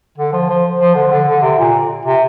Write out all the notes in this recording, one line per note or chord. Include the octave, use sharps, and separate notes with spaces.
D3
F3
F3
F3
D3
D3
D3
C3
A#2
C3